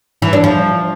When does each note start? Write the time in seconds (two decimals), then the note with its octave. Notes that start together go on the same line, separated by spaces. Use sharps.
0.22 E3
0.33 D4
0.44 F3